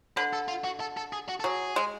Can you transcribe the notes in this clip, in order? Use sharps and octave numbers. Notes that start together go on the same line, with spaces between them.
D3 B4
A4
F4
F#4
A4
A4
G#4
F#4
A4
F#3 G#4
G#3